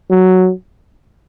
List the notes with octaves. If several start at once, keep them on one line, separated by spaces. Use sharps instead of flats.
F#3